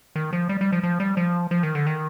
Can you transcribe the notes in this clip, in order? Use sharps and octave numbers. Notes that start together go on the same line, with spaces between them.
D#3
F3
G3
G3
F3
F3
G3
F3
F3
D#3
D3
D#3